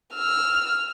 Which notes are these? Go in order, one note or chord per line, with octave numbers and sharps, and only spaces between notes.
E6 F6